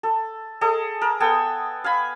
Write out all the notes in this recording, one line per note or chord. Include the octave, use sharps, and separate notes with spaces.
A4
G#4 A4 D#5
A#4
B3 A4 G5 G#5
F5 G#5 B5